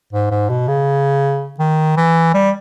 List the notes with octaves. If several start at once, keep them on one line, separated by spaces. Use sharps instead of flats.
G#2
G#2
B2
C#3
D#3
E3
G3